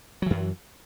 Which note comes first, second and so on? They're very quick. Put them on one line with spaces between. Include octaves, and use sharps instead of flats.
F#3 E3 F#2